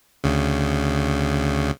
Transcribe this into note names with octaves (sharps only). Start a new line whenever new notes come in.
D2 C#3